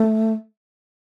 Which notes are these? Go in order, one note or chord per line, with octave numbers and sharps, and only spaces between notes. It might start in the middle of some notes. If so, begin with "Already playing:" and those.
Already playing: A3